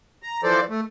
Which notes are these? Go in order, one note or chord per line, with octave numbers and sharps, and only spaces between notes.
A#5
E3 F3 A4 C5 D5
A3